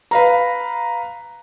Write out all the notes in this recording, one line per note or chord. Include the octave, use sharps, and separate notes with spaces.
B4 F5 A#5